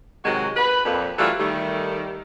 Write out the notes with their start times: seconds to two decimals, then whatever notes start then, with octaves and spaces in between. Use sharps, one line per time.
0.24 C3 D#3 F#3 G#3 F#4
0.56 B4
0.85 F2 A#2
1.18 E3 F#3 G3 A3 F4 A4
1.38 D#3 G3 A3